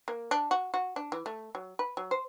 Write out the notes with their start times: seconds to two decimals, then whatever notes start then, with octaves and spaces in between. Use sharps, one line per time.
0.08 A#3
0.31 D4
0.51 F#4
0.74 F#4
0.96 D4
1.12 E3
1.26 A3
1.55 F#3
1.79 B4
1.97 F#3
2.11 C5